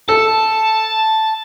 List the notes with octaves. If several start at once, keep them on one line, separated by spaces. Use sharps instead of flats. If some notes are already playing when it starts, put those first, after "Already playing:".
A4 A5